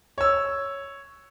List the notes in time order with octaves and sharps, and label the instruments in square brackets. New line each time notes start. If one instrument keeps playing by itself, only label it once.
[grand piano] C#5 E6